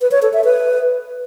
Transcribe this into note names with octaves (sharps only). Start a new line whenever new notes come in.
B4
C#5
A4
E5
B4